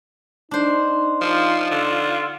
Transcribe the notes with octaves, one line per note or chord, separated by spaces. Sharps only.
D4 D#4 C5
F3 F4
D3